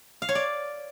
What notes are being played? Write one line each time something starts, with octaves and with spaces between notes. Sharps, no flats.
F5
C#5
D5